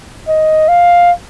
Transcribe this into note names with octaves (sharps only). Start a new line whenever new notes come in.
D#5
F5